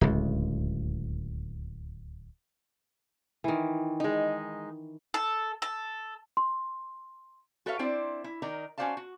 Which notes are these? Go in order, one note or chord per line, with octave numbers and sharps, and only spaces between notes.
D1 C#2
D#3 E3
G#3 D#4
A4
A4
C6
F#4 A4 B4 C#5 E5 F5
C4 D4 E4 C5 D5 E5
E4
D#3 D#4 A#4 D5 A#5
C#4 F#4 C5 D5 F5 A5
F#4